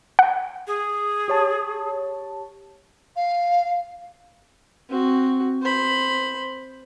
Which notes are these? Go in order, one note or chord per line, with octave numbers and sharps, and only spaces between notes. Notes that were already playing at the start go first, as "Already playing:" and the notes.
F#5
G#4
G4 C#5 A5
F5
C4 F#4
C5 B5